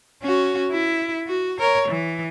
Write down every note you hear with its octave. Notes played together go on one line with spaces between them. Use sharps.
C#4 F#4
E4
F#4
A#4 C#5
E3